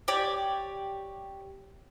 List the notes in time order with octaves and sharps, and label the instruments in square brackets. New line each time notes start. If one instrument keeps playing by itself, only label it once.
[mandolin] G4 C#5 D5